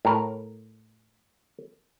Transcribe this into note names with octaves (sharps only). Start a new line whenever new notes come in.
A2 A#4